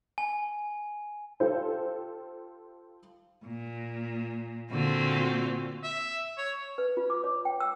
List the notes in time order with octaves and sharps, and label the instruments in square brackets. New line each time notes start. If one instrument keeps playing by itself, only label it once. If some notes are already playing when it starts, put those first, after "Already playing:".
[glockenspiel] G#5
[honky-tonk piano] F4 G4 A4 C5
[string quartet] A#2
A#2 D3 C4 F4 F#4
[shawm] E5
C#5
[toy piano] B4
F4
D6
C#5
G5
E6